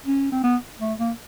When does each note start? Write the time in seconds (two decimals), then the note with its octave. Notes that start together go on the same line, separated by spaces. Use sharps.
0.06 C#4
0.32 C4
0.44 B3
0.80 A3
0.99 A#3